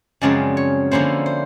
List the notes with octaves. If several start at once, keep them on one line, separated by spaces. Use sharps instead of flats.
F#2 C#3 F3 G#3 C4 D5
C#5
D3 F3 A#3 C#4 E4 C5
C5